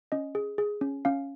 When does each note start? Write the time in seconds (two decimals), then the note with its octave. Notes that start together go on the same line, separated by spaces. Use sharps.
0.12 C#4 D#5
0.35 G#4
0.58 G#4
0.81 C#4
1.05 C#4 F5